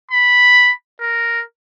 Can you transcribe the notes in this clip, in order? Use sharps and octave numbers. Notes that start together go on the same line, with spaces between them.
B5
A#4